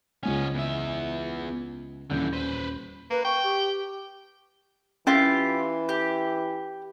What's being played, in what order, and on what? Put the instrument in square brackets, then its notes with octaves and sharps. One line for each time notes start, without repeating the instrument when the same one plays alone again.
[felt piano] C#2 G#3 G#5 [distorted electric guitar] B3 C#4
[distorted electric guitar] E2 E5
[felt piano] D#1 C#4 G6 [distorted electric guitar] D3 E3
[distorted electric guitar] B4 C5
[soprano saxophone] A#3 [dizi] B4
[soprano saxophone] G5 [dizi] C#6
[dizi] G4
[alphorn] E3 [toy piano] C#4 E5 [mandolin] E4 F4 G4
[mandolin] G4